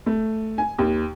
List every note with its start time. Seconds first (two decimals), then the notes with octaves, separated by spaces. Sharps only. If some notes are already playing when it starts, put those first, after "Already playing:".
0.06 A3
0.58 G#5
0.78 D#2